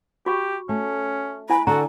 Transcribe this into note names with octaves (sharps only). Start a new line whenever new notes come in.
F#4 G4 C#6
A3 C#4
E4 G#5 B5
D3 F#4 A4 A#5